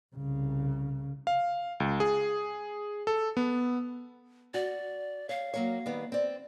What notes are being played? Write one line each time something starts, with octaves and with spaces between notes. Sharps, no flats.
C2 C#3
F5
C#2
G#4
A4
B3
F#4 D5
C#5 F5
F#3 A#3 C#5
D#3 G3 B3
C4 D5